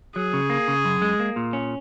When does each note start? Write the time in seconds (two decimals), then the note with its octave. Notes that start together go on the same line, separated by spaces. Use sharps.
0.16 F#3 G#4
0.33 C#3
0.50 A#3
0.68 C#3
0.85 F#2
1.02 G#3
1.20 A#3
1.36 A#2
1.53 C#4